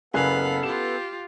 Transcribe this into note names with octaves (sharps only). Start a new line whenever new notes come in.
F#1 B3 A4 F5 F#5 G#5 B5 F#6
F4 G4 E7